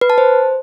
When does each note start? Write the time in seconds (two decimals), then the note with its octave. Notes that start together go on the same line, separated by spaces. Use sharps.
0.01 B4
0.10 A5
0.18 C5